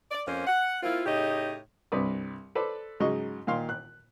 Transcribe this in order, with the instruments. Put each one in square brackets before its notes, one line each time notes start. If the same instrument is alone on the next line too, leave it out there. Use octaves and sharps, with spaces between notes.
[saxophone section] D5
F2 A#3 C#4 C5
F#5
A#3 C4 E4 F4
A2 C#3 D#4 G4 D#5
[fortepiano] C2 G2 B4 D5 D#6
A4 B4 C5 D5
G#2 C#3 F#3 D#5 C#6
A#2 D#3 F5 C6
F#6